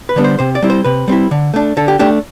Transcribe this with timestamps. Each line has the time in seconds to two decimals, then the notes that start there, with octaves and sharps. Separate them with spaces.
0.09 B4
0.16 D3 G3 B3 D4
0.24 C5
0.39 C3 C5
0.55 D5
0.62 G3 C4 E4
0.70 C5
0.84 C3 B4
1.08 G3 C4 E4
1.31 D3
1.54 A3 D4
1.77 D3 A4
1.88 G4
1.99 A3 D4 G4